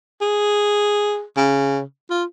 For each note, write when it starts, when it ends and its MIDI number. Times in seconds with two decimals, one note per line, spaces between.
0.21 1.23 68
1.37 1.81 49
2.10 2.24 65